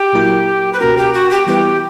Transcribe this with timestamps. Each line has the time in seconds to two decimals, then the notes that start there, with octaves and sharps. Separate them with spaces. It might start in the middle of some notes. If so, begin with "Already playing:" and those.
Already playing: G4
0.13 A#2 F#3 A#3 E4 A#4
0.73 B4
0.80 C#2 B2 A#3 C#4 F#4 A#4
0.97 G4
1.13 F#4
1.30 G4
1.47 E3 G3 B3 E4 G4 B4